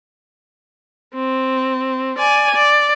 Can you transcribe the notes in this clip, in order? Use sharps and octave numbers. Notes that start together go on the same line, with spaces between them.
C4
D5 G#5
D5